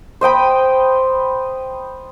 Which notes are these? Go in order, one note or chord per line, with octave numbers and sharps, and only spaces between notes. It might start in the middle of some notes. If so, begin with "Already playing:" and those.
C5 D#5 G5 B5